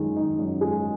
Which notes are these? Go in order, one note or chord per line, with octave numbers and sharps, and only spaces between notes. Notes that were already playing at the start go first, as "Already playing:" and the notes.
Already playing: F#2 D#3 G#3
D#4
F#2
G#3